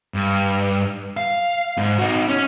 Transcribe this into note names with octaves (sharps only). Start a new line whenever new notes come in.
G2
F5
G#2
D#4 F#4
C#4